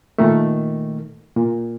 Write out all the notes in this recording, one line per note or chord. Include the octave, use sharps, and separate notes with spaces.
A#2 D#3 A3
A#2